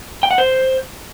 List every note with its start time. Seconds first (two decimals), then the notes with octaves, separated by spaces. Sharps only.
0.23 G5
0.31 F#5
0.38 C5